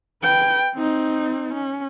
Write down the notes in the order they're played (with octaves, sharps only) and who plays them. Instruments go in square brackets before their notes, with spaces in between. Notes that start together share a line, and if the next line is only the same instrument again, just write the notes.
[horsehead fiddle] B4 G5
C4 D#4
C#4